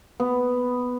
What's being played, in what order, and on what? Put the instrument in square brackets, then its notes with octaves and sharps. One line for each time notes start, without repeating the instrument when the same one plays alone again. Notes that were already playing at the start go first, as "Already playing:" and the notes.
[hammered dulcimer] B3